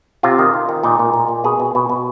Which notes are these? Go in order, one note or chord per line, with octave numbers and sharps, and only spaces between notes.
C3 F4
D#3
D#3
D#3
A#2 D#4
A#2
A#2
A#2
B2 G#4
B2
B2
B2